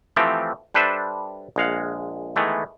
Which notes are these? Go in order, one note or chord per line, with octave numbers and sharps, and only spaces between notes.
E3 F3 A3 C4 G4
G3 D4 A4 B4 C5 E5
A#1 G#3 F5 F#5
D#3 E3 G#3 A3 B3